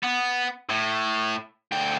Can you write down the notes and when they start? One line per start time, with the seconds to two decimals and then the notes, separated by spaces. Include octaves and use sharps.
0.03 B3
0.69 A2
1.72 D2 G5